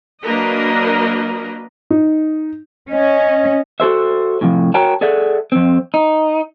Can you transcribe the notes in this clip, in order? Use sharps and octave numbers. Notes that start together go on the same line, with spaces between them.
F#3 A#3 D4 A#4 B4 D#5
D#4
C#4 D#5
F#4 A4 C5 E5
A2 C3 F3
F#4 A#4 C#5 G5 A5 A#5
G#4 A4 D5 E5 F#5
F2 C4
D#4